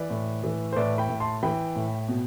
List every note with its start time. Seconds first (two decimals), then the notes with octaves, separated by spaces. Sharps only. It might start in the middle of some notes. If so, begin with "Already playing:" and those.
Already playing: E3 B4 D5
0.10 A2
0.44 E3
0.72 C5
0.76 A2 B4 D5
0.98 G5 B5
1.09 A2
1.20 A5 C6
1.43 E3 G5 B5
1.76 A2
2.09 B2